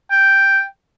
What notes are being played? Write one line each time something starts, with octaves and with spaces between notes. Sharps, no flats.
G5